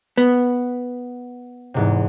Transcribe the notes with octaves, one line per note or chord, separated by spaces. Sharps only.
B3
E2 G#2 C3